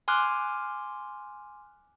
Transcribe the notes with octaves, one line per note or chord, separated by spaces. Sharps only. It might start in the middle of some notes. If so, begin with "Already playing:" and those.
G#5 C6 D6 F6 F#6